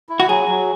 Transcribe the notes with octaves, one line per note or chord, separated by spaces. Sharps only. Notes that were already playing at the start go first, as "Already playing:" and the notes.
E4
F#4
F#3 G#4
F#3